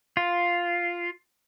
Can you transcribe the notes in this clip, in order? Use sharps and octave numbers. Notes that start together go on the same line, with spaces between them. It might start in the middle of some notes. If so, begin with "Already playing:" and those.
F4